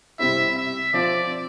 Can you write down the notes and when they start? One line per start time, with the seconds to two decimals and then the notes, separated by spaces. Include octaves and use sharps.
0.19 C3 G3 C4 E4 E5
0.56 E5
0.94 F3 C4 F4 D5